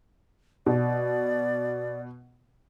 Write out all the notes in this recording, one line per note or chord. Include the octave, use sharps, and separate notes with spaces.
B2 D5